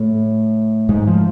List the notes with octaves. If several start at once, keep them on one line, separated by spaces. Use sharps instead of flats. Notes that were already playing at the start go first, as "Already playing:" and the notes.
Already playing: A2 A3
G#2 G#3
F3